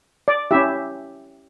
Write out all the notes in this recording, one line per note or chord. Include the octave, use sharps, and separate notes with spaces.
D5
C#4 E4 G4 E5